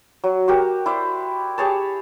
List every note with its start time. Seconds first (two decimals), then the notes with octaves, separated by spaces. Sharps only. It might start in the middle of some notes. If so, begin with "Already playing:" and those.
0.24 F#3
0.48 F#4 G4 A#4
0.86 E4 C5 D5
1.58 G4 G#4 C#5 A5